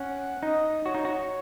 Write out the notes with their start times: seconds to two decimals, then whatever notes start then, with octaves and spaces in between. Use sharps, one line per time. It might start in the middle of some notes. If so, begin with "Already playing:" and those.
Already playing: C#4 F#5
0.43 D#4 D#5
0.85 F#4 C#5
0.94 D#4
1.05 F#4